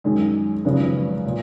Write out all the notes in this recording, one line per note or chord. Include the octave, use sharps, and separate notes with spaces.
F#2 D#3 G#3
G#1 F#2 C#3 F3 B3
A#2